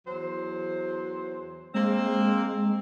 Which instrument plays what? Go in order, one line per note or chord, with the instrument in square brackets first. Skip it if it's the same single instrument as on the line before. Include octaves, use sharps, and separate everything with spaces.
[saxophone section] E2 F#3 C5
[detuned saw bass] G#3 [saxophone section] A#3 C4